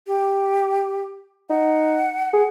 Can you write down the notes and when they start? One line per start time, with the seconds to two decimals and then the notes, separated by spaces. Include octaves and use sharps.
0.07 G4
1.50 D#4 F#5
2.33 G#4